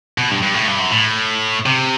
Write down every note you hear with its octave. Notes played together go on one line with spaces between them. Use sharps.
B2
G2
G2
A2
G2
F#2
A2
C3